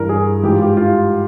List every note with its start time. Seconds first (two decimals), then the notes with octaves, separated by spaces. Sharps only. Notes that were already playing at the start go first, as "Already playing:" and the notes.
Already playing: G2 E3 A#4
0.09 G#4
0.43 G#2 E3 G4
0.52 F4
0.62 G4
0.77 F4